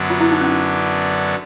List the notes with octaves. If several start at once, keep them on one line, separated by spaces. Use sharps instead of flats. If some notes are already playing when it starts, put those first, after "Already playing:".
Already playing: F#2 D3 F#3 B3 D4
F4
E4
D#4
C#4